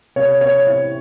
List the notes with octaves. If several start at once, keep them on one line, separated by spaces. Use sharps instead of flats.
C3 C#5
C4 C#5
E4